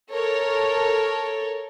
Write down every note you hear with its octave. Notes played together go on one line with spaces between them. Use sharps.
A4 A#4 C#5